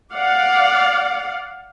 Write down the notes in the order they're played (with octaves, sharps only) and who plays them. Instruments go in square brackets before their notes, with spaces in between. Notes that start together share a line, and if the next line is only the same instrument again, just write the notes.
[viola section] D5 F5 F#5